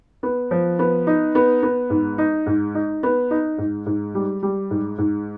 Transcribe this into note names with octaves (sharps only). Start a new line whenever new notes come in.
B3
F3
B3
D#4
B3
B3
G#2
D#4
G#2
D#4
B3
D#4
G#2
G#2
G3
G3
G#2
G#2